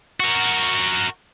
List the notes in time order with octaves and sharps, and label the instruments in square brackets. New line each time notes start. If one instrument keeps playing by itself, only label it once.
[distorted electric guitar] F#4 A#4